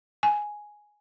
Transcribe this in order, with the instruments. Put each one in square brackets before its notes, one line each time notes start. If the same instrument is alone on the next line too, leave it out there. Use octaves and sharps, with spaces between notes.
[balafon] G#5